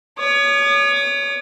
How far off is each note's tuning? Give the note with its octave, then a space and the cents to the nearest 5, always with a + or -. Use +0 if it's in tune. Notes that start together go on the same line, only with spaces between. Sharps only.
C#5 +25 D#6 -40